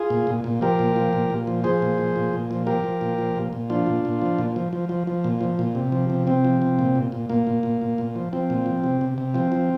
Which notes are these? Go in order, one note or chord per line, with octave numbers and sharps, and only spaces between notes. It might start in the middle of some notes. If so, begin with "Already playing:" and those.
Already playing: F4 G#4
A#2
A#2
A#2
F3 G4 A#4
A#2
F3
A#2
A#2
F3
F3 G#4 C5
A#2
F3
A#2
A#2
F3
F3 G4 A#4
F3
A#2
F3
A#2
A#2
F3 D4 F4
A#2
A#2
F3
A#2
F3
F3
F3
F3
A#2
F3
A#2
C3
F3
C3
C3 C4
F3
C3
A#2
A#2
A#2
A#2 A#3
A#2
A#2
A#2
A#2
F3
F3 C4
A#2
F3
C3
C3
C3
F3 C4
F3